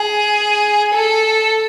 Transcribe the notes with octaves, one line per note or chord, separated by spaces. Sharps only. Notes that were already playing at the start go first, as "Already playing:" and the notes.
Already playing: G#4
A4